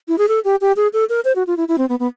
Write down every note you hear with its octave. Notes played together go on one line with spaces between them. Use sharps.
E4
G#4
A4
G4
G4
G#4
A4
A#4
C5
F#4
F4
E4
E4
C4
B3
B3